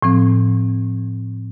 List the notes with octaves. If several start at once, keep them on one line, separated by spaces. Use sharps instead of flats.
A2 F3 C4